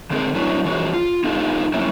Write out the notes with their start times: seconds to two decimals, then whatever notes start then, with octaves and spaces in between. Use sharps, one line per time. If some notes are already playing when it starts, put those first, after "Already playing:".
0.11 D3 G#3 C4 F4 G#4 A#4
0.35 F#3 B3 C#4 D4 E4 F#4
0.65 E3 F3 C#4 F#4 G#4
0.94 F4
1.24 B3 D#4 F4 G4 A4
1.73 F#3 A#3 C#4 E4